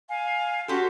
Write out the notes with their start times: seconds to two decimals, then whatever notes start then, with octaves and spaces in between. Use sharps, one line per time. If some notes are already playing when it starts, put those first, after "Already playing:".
0.09 F5 G#5
0.68 C#4 F#4 G4 A4 C6